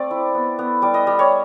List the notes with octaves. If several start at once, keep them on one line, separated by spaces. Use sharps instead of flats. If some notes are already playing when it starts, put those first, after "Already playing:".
Already playing: A3 C4 D5
E4
B3
B3
G3 D5
D#5
G3
C#5